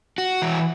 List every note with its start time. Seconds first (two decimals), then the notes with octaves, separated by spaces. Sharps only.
0.18 F#4
0.42 E3